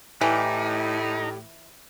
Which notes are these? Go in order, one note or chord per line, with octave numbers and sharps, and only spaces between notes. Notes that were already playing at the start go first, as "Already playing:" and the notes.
A2 E3 D#4 G4 D5